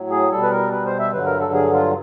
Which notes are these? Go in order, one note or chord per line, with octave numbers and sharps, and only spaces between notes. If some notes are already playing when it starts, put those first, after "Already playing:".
Already playing: A2 F#3
G#4
B2 G3 A4
B4
A#4
B4
C5
E5
G2 D3 F#3 B4
A#4
A4
G#4
F4